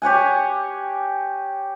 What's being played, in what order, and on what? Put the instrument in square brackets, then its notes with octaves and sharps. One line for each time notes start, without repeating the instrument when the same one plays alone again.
[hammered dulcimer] G4 C#5 F#5 G#5